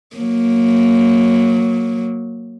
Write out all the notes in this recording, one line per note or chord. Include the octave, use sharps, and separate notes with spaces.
F#3 A#3